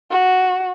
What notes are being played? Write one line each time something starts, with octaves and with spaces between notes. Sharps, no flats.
F#4